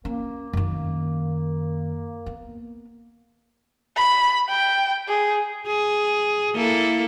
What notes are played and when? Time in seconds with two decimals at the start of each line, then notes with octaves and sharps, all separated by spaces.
0.05 A#3 C#4
0.53 F#2 D#3
2.26 B3
3.97 B5
4.49 G5
5.09 G#4
5.67 G#4
6.55 A#3 E4 A4